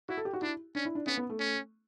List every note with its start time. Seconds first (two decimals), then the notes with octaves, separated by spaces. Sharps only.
0.09 E4 F#4
0.17 A4
0.25 G4
0.33 F#4
0.42 D4 E4
0.75 C#4 D4
0.85 E4
0.95 D4
1.07 B3 C#4
1.18 B3
1.30 A3
1.39 C#4